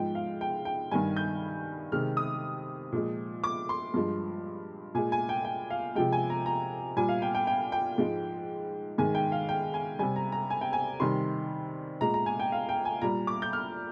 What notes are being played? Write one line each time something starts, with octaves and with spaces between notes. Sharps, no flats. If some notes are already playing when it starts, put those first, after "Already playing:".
Already playing: G#2 F3 G#3 G5
F5
G5
G5
G2 D#3 G3 G#5
G6
C3 D#3 G#3 F6
D#6
A#2 F3 G#3
D6
C6
G2 F3 G#3
A#2 G#3 G#5
G#5
G5
G5
F5
C3 F3 G#3 G5
G#5
A#5
A#5
A#2 G3 G#5
F5
G5
G5
G5
G5
G#2 F3 G#3
G#2 D#3 G#3 G#5
G5
F5
G5
G#5
C3 G3 G#5
A#5
A#5
G#5
G5
G#5
C3 D#3 G3 C6
A#2 G#3 A#5
A#5
G#5
G5
F5
G5
G#5
A#2 G3 A#5
D6
G6
F6